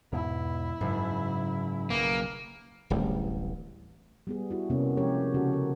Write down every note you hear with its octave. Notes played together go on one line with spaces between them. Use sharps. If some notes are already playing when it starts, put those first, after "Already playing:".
E2 G#2 B2 E4
F#1 G#2
B1 A#3 F#4
D1 A1 E3 G3
G3 B3 G#4
E4 F#4
C3 A#3 B3 C#4
F3 G#3 C#4 G4 A#4 C#5
C#3 F#4 A4
A#4